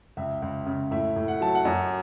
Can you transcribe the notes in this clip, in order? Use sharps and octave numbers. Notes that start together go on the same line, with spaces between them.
C#2 E5
C#2
C#3
A2 E5
A2
F#5
F#3 A5
F#5
F#2